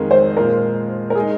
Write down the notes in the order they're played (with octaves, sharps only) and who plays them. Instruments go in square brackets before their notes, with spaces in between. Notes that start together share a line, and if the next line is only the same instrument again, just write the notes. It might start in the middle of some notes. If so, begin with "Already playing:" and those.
Already playing: [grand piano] F2 D#3 G#3 [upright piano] A#4
[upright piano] C5
[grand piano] A#2 G#3 F4 [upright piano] A#4
[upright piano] A#4
[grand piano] G#3 D#4 [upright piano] G#4